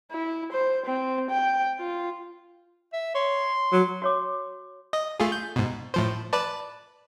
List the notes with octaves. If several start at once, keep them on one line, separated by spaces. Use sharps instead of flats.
E4
C5
C4
G5
F4
E5
C#5 C6
F#3
F#4 C#5 D6
D#5
A3 F4 G#4
G6
G#2 B2
A2 F3 C5
B4 D5 A5